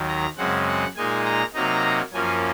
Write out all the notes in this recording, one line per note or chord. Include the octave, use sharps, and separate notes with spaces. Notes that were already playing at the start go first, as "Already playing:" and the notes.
Already playing: D#2 D#3 F#3
A#5
F#2 C#3 G#3 C4 F#5
F#5
A#2 G#3 D#4 G#5
A#5
C3 F#3 A#3 D#4 A#5
F#2 F3 A#3 C#4 G#5